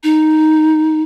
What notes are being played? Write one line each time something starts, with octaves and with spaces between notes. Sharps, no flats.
D#4